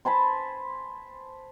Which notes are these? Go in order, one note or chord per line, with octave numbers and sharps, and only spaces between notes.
C5 G#5 A5 B5